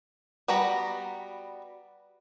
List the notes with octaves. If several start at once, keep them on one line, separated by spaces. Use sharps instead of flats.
G3 B3 F#4 A#5 B5